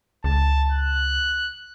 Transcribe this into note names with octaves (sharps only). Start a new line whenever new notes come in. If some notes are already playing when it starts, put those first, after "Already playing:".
C#2 A5
F#6